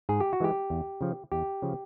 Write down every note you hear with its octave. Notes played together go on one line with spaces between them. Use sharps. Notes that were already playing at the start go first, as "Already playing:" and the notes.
G#2 G#4
G4
F#4
E3 G#3 G4
E2
C#3 F3
E2 G4
C#3 F3